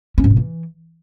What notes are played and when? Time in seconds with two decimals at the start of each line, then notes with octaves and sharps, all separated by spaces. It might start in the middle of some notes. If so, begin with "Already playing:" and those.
0.18 C#4
0.24 G#2
0.30 B2
0.37 E3